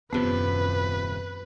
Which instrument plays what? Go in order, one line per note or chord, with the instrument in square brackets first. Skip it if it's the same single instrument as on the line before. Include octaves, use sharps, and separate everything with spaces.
[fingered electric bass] D#1 C3 F3 [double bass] F#2 [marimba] B3 [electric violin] B4